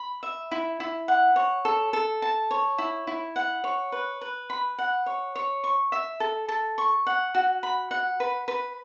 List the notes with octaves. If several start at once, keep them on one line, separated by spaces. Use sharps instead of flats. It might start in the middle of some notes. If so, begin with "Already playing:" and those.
Already playing: B5
E5
E4
E4
F#5
C#5
A4
A4
A5
C#5
E4
E4
F#5
C#5
B4
B4
B5
F#5
C#5
C#5
C#6
E5
A4
A4
C#6
F#5
F#4
B5
F#5
B4
B4